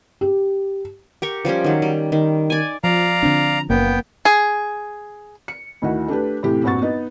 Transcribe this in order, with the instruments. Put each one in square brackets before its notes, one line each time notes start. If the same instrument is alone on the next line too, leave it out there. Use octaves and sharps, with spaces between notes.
[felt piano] G4
[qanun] G4 A#4 C#6
F3 G3 C#4 G4
D#3 F#3
G3
D#3
D5 G#5
[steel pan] F3 [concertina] D5 F5 [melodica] A#5
[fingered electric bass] D3 C4 D4
[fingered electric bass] F#1 C#3 [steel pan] A#3 [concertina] B3 G5
[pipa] G#4
[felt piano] C#7
D2 D#3 E4 F#4
A3 D4 G4 B4
A2 C3 E3 A3 G4
A#1 G2 C4 F#4 C#6 A6
B3 D#4